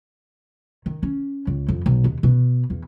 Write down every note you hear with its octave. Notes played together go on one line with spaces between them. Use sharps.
D#3
C#4
C#2
F2
B1
D#2
B2
E2